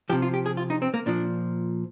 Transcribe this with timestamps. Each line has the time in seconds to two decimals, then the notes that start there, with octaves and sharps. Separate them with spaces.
0.09 F3 G4
0.12 C3
0.22 F4
0.34 G4
0.46 G#4
0.57 F4
0.70 D#4
0.82 C4
0.94 A#3
1.06 A#2 F3 D4